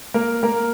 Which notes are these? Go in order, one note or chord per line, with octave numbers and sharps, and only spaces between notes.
A#3 A#4
A#3 A#4